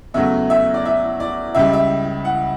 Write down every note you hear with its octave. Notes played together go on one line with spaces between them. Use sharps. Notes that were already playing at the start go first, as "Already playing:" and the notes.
E2 C#3 F#3 A3 E5
E5
D5
E5
D5
C#2 C#3 G3 E5
E5
F#5